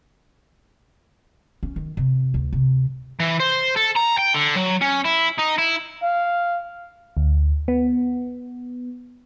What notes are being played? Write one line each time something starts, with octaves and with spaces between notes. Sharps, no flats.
C#4
D#3
C3
D2
C3
E3
C5
A4
A#5
G5
D3
F#3
C#4
E4
D#4
E4
F5
D2
B3